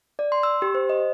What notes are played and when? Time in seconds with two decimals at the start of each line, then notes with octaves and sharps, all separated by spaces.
0.19 D5
0.32 C6
0.43 E6
0.62 G4
0.75 C5
0.89 D#5